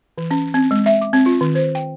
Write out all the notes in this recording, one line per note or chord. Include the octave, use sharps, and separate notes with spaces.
E3
C#4
C4
G#3
E5
D6
C4
F4
D#3
C5
G5